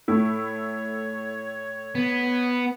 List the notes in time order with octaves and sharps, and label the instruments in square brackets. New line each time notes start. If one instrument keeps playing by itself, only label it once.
[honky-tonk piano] A2 A3 E4 [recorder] C#5
[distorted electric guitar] B3